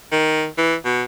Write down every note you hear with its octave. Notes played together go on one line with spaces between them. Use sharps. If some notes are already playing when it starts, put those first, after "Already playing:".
D#3
E3
B2